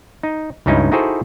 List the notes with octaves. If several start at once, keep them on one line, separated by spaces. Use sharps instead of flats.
D#4
C#2 G2 C#4 D#4 E4
D#4 E4 F#4 G#4 A4 C5